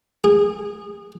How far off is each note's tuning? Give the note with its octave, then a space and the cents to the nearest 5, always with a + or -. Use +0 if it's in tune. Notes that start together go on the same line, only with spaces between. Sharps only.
G#4 -30